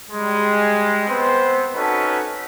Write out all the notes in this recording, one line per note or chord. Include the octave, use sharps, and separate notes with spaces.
G3 G#3
B3 C4 B4 C5
C#4 D#4 F#4 A4 B4